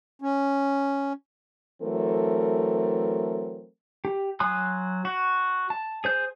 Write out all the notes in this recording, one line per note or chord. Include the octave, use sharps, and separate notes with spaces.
C#4
E3 F#3 A3 C4 A4 A#4
G4
F#3 G#5 C6 D#6 F#6
F#4
A5
G#4 C5 G6